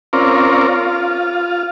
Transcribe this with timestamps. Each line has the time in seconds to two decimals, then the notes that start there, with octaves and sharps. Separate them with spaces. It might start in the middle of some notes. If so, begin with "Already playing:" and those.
0.13 C4 C#4 F4 A#4 D5
0.68 F4